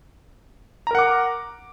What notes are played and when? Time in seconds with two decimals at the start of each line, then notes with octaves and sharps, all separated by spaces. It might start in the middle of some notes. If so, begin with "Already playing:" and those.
0.87 A#5
0.91 A#4
0.95 F#5
0.99 D6